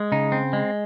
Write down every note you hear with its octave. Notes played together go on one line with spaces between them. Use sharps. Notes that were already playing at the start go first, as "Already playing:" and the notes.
Already playing: G#3
C#3 D#4
C4
G#3